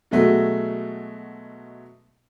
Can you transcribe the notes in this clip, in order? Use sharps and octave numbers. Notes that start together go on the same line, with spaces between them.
B2 F#3 G#3 A3